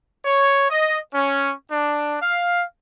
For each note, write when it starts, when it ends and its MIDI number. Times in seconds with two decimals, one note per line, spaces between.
0.24 0.67 73
0.69 0.97 75
1.14 1.53 61
1.70 2.16 62
2.20 2.63 77